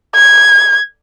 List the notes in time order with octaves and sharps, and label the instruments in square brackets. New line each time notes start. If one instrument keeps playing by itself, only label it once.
[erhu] G#6